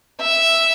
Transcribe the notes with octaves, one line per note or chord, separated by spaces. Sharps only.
E5